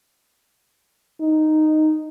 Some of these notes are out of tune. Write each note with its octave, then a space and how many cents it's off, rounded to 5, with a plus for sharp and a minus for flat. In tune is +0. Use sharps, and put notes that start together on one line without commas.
D#4 -5